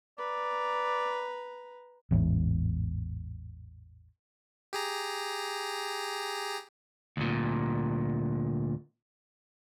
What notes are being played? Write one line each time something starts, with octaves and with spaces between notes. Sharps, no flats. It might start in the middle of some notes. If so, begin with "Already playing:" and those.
B4 D5 A#5
A1 E2 G#2
G4 G#4 A#5
D2 A#2